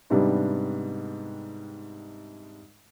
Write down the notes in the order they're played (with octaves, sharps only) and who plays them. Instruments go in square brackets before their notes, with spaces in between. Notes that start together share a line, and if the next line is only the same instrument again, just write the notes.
[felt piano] G#2 C3 G3 B3 D4